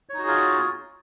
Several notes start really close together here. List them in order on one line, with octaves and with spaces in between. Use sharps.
C#5 D#4 F#4 G#4 F4